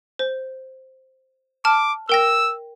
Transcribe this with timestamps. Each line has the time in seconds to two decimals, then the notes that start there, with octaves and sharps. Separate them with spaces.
0.19 C5
1.65 A5 D6 F6
2.09 A#4 G5 E6 A#6